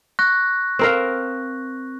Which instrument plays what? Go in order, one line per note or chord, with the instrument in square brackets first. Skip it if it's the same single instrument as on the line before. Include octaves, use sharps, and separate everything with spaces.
[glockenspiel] C#6 F#6 A#6
[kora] C4 A#4 F5